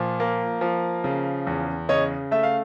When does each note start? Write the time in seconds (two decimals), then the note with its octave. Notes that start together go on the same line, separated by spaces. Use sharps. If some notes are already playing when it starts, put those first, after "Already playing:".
Already playing: A#2 F3
0.20 A#3
0.61 F3
1.04 C#3
1.47 E2
1.89 C#3 C#5 D#5
2.31 A3 E5
2.43 F5